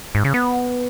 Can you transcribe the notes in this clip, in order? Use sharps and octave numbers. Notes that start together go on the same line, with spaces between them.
G#2
C#3
B3